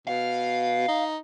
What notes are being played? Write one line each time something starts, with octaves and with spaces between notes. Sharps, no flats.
B2 F5
D#4